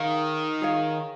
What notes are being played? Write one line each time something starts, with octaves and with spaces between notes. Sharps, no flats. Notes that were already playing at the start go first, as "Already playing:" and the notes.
Already playing: D#3 G#4 C#5 F5
G#4 C#5 F5